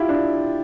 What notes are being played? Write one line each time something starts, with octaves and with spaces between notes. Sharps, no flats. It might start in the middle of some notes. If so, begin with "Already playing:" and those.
Already playing: E4 F4 G4
D4